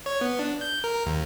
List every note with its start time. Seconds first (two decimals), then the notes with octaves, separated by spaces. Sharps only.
0.06 C#5
0.21 B3
0.39 D4
0.61 G6
0.84 A#4
1.06 D#2